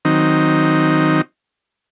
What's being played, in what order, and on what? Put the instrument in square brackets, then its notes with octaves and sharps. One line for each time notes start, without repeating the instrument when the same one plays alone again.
[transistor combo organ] D#3 F#3 C4 D#4